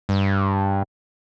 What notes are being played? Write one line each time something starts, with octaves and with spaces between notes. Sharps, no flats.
G2